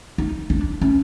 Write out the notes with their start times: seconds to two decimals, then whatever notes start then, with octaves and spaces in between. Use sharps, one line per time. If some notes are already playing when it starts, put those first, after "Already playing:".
0.18 D#4
0.50 D4
0.81 C#4